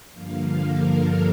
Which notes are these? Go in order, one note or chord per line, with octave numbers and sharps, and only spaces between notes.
G2 D3 F3 A#3 F5
A#4
A4